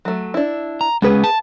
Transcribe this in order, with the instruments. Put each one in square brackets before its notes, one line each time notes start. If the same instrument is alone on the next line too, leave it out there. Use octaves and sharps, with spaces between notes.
[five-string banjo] F#3 A3
D4 E4
[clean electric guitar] A#5
[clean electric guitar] G#3 C#4 [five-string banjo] B3 G#4 B4
[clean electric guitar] A5